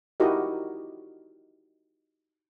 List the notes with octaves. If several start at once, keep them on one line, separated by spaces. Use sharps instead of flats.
D#4 E4 F#4 G4 A#4 D#5